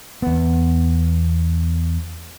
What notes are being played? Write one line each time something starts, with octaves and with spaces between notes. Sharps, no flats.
E2 B3